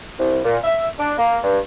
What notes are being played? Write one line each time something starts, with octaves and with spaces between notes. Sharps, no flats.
C2
A#2
E5
D4
A#3
G2